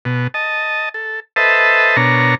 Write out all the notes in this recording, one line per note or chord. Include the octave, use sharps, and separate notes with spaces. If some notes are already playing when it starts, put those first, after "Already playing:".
B2
D#5 A5
A4
A4 B4 C5 D#5 E5 A5
B2 D4 A#4 C#5 A#5